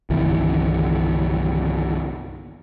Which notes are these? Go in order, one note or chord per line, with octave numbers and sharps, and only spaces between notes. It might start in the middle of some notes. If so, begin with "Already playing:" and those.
G1 C2 D#3 E3